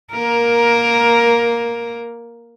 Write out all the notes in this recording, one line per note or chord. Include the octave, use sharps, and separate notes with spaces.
A#3 A#4